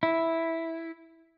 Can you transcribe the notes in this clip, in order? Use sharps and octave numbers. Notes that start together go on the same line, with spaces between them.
E4